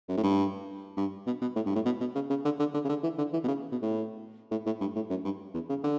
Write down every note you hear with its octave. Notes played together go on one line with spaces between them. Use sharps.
F#2
A2
G2
G2
B2
B2
A2
G2
A2
B2
B2
C#3
C#3
D3
D3
D3
C#3
D3
E3
D3
E3
B2
C#3
B2
A2
A2
A2
G2
A2
F#2
G2
E2
C#3
D3